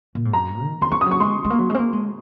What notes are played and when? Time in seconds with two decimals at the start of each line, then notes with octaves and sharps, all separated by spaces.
0.15 A#2
0.25 G#2
0.33 F#2 A#5
0.63 D#3
0.81 D#3 C6
0.91 F3 C#6
1.01 D#6
1.06 F#3
1.11 C#6
1.20 G#3 C6
1.45 G#3
1.50 A#3
1.59 F#3
1.70 G#3
1.74 C4
1.79 A#3
1.93 G#3